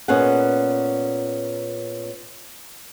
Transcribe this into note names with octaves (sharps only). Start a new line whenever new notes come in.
A#2 B3 C#4 G#4 D#5 F#5